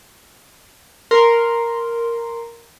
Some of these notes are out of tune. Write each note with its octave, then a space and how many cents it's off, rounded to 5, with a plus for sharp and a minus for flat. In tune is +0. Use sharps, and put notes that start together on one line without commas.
A#4 +0 C6 +0